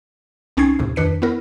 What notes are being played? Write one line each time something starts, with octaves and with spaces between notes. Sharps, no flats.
C2 C4 C#4 D#4 G#6 C7
D#2 A2 C3
F2 D#3 D4 B4 B6 C#7
B3 E4 A#4